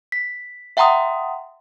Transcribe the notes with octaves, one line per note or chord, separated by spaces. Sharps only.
B6
E5 F#5 G5 A#5 C6 D#6